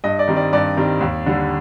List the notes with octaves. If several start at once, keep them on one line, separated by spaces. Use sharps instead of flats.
G2 D#5
D5
D#3 G3 C4
D5
G2 D5
D#3 G3 C4
D#2
D3 G3